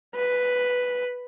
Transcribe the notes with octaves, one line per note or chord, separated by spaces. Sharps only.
B4